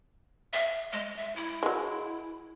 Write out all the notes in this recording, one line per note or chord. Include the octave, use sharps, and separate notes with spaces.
E5
G#3
E5
E4
F#3 G#3